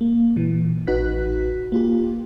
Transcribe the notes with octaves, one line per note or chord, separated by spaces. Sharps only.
A#3
A#2 E3
A1 D#4 F#4 B4 F#6 B6
A#3 F4 G4